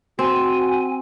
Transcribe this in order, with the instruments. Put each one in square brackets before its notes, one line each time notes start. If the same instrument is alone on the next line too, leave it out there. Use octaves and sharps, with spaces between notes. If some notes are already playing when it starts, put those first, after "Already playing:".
[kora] C4 [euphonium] F#4 [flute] G#5